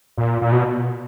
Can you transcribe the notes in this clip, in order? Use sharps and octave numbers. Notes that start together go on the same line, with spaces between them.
A#2
A#2
B2